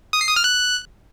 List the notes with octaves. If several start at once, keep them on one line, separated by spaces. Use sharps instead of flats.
D#6
C7
D#6
F6
F#6